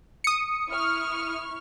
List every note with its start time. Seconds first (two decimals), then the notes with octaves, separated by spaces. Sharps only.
0.24 D#6 C#7
0.68 E4 C#6 F6